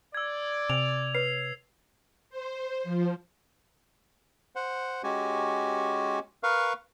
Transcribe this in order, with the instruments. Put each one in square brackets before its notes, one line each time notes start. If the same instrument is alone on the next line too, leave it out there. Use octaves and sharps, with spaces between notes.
[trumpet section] D5 [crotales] E6 G#6
[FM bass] C3 [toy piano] G#5 [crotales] F7
[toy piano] B4 C#5 [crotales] C7
[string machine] C5
F3
[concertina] C5 F#5
G#3 C#4 F#4 G4 G#5
A#4 B4 F5 C#6